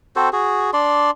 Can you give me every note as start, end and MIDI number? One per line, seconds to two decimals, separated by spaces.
0.16 0.29 60
0.16 0.29 66
0.16 0.29 69
0.16 0.29 72
0.33 0.71 66
0.33 0.71 68
0.73 1.11 62
0.73 1.11 74
0.73 1.11 84